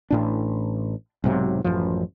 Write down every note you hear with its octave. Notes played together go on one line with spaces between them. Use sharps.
A1 A2 D4
B1 G#2 C3 F#3
A1 F#2 F3